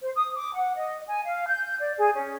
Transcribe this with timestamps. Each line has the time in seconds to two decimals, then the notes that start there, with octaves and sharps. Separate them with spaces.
0.02 C5
0.16 D#6
0.35 D6
0.54 F#5
0.76 D#5
1.07 G#5
1.24 F5
1.47 G6
1.79 D5
1.98 G#4
2.14 C#4